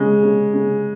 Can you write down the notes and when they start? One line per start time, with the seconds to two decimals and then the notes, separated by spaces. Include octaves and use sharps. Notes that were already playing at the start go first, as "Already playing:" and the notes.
Already playing: C#3 G#3
0.23 C#3
0.53 C#3